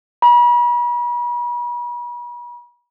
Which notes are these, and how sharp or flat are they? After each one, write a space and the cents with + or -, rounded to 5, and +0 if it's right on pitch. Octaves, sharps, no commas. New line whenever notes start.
B5 -40